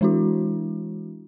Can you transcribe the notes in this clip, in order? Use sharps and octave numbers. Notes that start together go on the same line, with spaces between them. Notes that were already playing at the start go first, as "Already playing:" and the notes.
E3 G#3 D4 E4 F#4